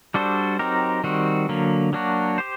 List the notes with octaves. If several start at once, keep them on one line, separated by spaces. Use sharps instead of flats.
G3 D4 F#4 A4 C5
F#3 C4 D#4 G4 A#4
D#3 G3 C4 F#4
D3 F#3 A#3
F#3 A#3 D4 F#4
G4 C5